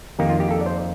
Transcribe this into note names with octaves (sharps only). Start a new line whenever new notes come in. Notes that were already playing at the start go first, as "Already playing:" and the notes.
F2 D#3 A#3 D#4 G4
F4
G4
A4
D5
C5